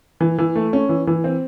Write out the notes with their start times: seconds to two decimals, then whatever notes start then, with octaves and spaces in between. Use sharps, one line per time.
0.20 E3
0.38 E3
0.56 A3
0.73 C#4
0.89 E3
1.07 E3
1.24 C4